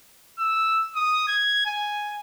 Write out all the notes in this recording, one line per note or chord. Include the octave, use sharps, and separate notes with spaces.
E6
D#6
G#6
G#5